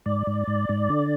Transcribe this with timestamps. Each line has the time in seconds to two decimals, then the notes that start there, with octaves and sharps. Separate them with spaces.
0.06 G#2 D5
0.27 G#2
0.48 G#2
0.69 G#2
0.90 D3